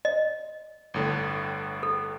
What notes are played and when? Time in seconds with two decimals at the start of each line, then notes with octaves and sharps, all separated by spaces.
0.05 D#5
0.94 G1 A2 D3
1.83 A4